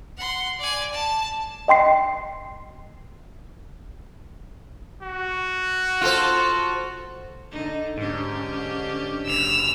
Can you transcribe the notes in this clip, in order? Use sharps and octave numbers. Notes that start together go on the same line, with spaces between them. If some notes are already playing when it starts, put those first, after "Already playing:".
F#5 C6
D5 G#5
A5
D#5 G5 C6 C7
F#4
F4 A4 C5
D3 D#4
G#2 D3 C#4 G4
F#1 E6 F7